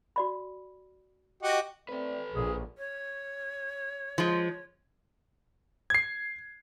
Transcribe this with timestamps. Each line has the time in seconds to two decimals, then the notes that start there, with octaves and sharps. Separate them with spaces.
0.16 F#4 D5 B5
1.43 F#4 G4 D#5
1.89 A3 C4 A4 B4 D5
2.34 A#1 A#2 G#4
2.78 C#5
4.18 F3 G#3
5.90 G#6 C7